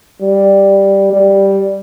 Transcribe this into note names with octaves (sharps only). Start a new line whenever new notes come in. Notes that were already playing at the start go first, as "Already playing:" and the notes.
G3
G3